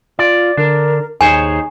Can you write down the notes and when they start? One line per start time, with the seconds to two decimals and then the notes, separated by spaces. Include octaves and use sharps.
0.19 F4 D5
0.57 D3 D4 A#4
1.21 D#2 D#4 G#4 C5 C#5 G#5